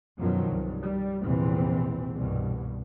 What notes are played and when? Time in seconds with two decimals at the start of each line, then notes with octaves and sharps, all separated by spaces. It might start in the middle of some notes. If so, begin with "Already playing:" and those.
0.18 F#2 B2 D#3 F3 F#3
0.50 C2 G2
0.82 G3
1.21 A#1 E2 C3 E3 C4
2.15 C2 G2 B2